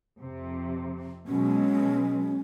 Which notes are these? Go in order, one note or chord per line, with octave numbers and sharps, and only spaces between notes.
F2 C3
B2 F#3 G#3 C#4